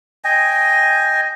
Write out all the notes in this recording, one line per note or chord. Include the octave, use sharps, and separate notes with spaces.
D#5 G5 G#5